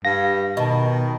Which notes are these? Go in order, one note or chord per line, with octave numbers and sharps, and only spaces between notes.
G2 F5 A#6
B2 D#3 D#5 A5